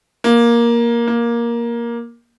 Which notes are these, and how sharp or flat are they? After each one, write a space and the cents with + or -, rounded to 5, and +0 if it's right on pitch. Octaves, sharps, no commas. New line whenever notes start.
A#3 +10
A#3 +10